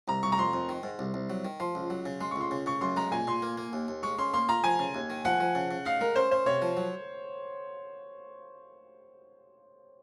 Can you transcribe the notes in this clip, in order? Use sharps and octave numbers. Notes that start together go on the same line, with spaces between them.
C2 A#5
C2 C#6
A#5
F2 C6
F2
D#3
G#2
C2
C2
F#3
D#3
F3 C6
C#2
F#3
C#3
G#3 C6
C#6
C#2 C6
C#3
C#3 C#6
F#2 C6
G#3 A#5
A#2 G#5
A#2 C6
A#3
A#3
D#2
D#2
G#3 C#6
C#4 C6
A#3 C6
F4 A#5
F3 G#5
C#3
D#2
D#3
F3 F#5
F3
C#3
C#3
D#4 F5
G#3 A#4
C#4 C5
C#4 C5
C3 C#5
F3
F#3